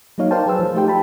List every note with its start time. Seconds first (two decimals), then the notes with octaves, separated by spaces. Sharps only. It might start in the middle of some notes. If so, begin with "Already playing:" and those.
0.18 F#3 A#3 D#4 C#5 F5
0.31 A#4 C5 D5 F5 G5 A5
0.46 F#3 G#4 B4 C5 A5 E6
0.59 F3
0.75 A3 D#4 G4 C5 G5
0.88 A5 B5